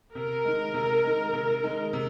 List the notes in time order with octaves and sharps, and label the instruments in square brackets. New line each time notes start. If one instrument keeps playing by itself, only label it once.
[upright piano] C3 [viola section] A#4
[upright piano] D#3 G#3
C3
D#3 G#3
C3
D#3 G#3
C3